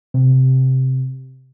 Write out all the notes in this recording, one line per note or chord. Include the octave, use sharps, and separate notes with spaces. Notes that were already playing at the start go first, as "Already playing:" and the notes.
C3